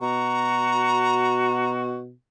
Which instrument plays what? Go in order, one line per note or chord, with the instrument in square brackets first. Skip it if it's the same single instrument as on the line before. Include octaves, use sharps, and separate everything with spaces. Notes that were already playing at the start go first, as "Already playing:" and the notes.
[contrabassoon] B2 [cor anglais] F#4 [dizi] A#5